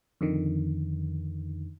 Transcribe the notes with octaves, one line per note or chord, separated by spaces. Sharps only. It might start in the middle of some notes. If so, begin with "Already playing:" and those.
F2 D3 D#3